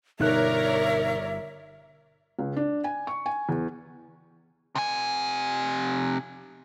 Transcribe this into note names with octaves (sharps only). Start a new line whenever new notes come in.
G1 B2 D#4 A#4 C#5 D5 E5 F#6
C#2
D4
G#5
C#6
G#5
E2
C3 G#5